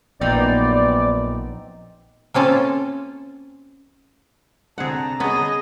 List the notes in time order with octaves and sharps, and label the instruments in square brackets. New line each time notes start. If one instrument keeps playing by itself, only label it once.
[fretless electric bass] A#1 [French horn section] F#2 B3 [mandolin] C4 D#4 G5 [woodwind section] D5
[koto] A#3 C4 C#4 F4 A4
[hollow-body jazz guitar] C2 D3 C4 [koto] G#4 F#5 [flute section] A5 A#5
[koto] B3 C#4 [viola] G#4 D#5